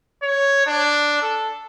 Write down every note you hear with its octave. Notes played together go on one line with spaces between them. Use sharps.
C#5
D4
A4